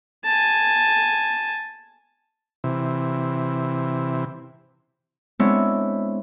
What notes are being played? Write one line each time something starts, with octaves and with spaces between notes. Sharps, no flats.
G#5 A5
C3 E3
G#3 B3 C4 D4 E4 C#5